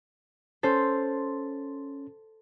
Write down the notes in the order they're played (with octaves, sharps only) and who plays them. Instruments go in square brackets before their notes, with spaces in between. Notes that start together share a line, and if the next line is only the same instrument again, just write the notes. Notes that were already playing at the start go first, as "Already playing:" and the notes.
[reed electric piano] C#4 C6 A6 [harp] A4 C5